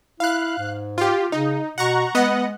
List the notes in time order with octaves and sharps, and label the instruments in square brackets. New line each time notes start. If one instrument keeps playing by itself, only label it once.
[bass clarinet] E4 [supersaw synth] F5 F#6
[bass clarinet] G#2
[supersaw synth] F4 G4
[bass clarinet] C#3 [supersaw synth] D#4
[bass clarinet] B2 [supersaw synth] F#5 A#5 C#6
[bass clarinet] G#3 [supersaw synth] B3 D#5 F#5